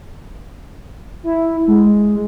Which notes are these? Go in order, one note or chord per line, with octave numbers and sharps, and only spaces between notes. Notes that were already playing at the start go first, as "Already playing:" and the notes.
E4
G#3